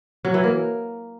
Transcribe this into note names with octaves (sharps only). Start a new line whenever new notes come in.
F#3
E3
A#3